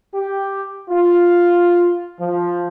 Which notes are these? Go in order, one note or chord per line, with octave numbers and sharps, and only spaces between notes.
G4
F4
F3